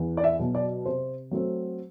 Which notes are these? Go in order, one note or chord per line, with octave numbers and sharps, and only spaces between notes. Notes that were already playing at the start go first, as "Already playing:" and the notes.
Already playing: E2
D5
E5
B2 F#3
D5
C3 C5
F#3 A3 C4